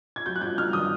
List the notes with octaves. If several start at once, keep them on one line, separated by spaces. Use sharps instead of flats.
G#6
F#3 G6
F#6
G2 G6
G2 F6
D#3 D#6